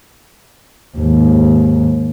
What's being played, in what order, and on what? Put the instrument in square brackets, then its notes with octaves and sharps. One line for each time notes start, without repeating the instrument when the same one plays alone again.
[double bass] D#2 G#2